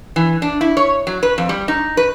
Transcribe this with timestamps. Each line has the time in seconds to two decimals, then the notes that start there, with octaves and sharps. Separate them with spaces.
0.16 E3
0.42 D4
0.61 E4
0.77 C#5
1.07 F#3
1.23 B4
1.38 F2
1.49 G3
1.68 D#4
1.97 B4